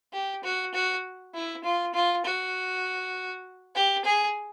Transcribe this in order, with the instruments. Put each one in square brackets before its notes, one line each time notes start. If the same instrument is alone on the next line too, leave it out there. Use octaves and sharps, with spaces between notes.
[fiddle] G4
F#4
F#4
E4
F4
F4
F#4
G4
G#4